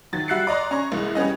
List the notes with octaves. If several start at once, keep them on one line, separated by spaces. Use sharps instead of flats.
D#3 F#3 A6
G3 F#4 E5 F#6 C7 C#7
D5 D#5 A#5 C6
C#4 A#5 C#6
C2 E3 G#3
G3 B3 C#4 D#5